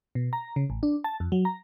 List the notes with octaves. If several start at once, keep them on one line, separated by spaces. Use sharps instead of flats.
B2
A#5
C#3
A1
D4
A5
F2
F#3
A#5